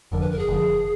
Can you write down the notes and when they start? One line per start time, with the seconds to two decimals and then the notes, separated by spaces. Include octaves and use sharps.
0.12 F#1 F2 D3 F3 A#4
0.21 B4
0.31 A#4
0.39 G#4
0.48 F#1 F2 D3 F3